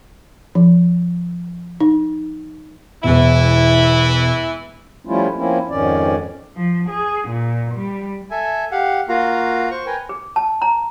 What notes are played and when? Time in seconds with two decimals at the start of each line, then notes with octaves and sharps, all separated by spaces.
0.55 F3
1.80 D#4
3.04 E1 E2 E3 E4
5.05 F3 G3 A3 C#4 E4 F4
5.36 F3 A#3 C4 C#4 E4
5.70 F2 G#2 D#3 C#4 D5
6.56 F3
6.89 G#4
7.29 A#2
7.75 G3
8.30 A4 E5 G#5
8.72 G4 F5 F#5
9.08 A#3 F4 F#4 F5 A#5
9.71 C5 C#6
9.86 A#4 B4 G5 G#5
10.09 G#4
10.36 A5
10.62 A#5